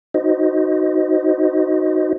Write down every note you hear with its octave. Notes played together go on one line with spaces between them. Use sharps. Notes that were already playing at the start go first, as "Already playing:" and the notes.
D#4 F#4 C5 D#5